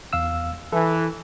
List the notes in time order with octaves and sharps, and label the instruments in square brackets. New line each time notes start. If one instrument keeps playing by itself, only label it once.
[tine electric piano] E2 F5 E6
[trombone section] E3 [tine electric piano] A4